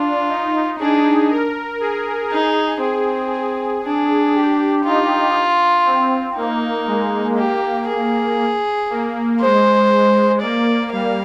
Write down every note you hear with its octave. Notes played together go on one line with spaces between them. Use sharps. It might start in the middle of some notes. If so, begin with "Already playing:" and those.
Already playing: D4 F4
D#4
D4 G#4
A#4
G#4
D#4 G#4
C4 G#4
G#4
D4
G4
D#4 F4
C4
A#3 D#4
G#3
A#3 G4
G#4
A#3
G#3 C5
A#3 D5
G3 F5